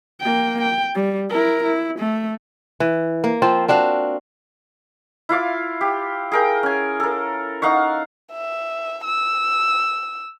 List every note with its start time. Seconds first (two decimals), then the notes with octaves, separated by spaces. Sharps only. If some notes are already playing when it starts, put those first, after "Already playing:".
0.21 A#3 G5
0.61 G5
0.95 G3
1.30 E4 A#4
1.63 E4
1.99 A3
2.80 E3
3.24 A#3
3.42 F3 C4 F4
3.68 C4 D4 F#4 F5
5.29 E4 F4 F5 D6
5.81 G4
6.32 G#4 A#4 G5
6.63 C#4 G#5
7.00 A4 A#4
7.62 D#4 F5 F#5 C#6
8.32 E5
9.04 E6